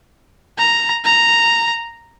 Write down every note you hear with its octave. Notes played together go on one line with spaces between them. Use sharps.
A#5
A#5